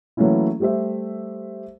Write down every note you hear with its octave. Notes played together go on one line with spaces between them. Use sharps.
E3 F#3 A3 A#3 C#4 E4
G3 A3 G4 C5 E5